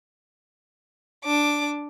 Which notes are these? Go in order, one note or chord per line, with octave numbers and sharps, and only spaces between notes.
D4 D6